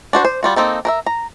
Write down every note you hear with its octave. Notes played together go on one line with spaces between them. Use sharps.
D4 F#4 C5
C5
G3 F4 F#4
A#3 C4 D#4 A4
A#4 B4 E5
A#5